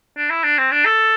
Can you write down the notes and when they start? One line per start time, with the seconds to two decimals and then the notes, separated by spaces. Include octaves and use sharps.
0.17 D4
0.30 E4
0.44 D4
0.58 C4
0.72 D4
0.86 A4